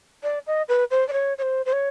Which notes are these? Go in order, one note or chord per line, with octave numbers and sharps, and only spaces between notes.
D5
D#5
B4
C5
D5
C#5
C#5
C5
C5
C#5